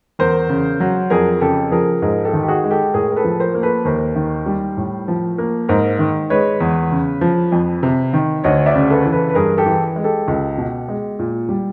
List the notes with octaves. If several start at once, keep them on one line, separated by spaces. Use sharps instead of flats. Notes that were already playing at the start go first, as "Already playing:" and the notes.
E2 A#4 C5
C#3
F#3
F2 G#4 A#4
C#3 G4 A4
F3 G#4 A#4
G#2 G#4 A#4
G4 A4
D#3
G4
F#4 G#4
G#3
G4 A4
A2 G#4 A#4
A#4
A4 B4
F3
A#4 C5
A#3
A4 B4
D#2 A#4 C5
D#3
G3
A2
F3
A#3
G#2 A#4 C5
D#3
G#3 B4 C#5
E2
C#3
F3
F2
C3
D#3
D2 C#5 D#5
D5 E5
C#3
A4 B4
E3
A4 B4
B4
G2 G#4 A#4
G4 A4
E3
G#3
G4 A4
C#2
B2
G#3
A#2
G3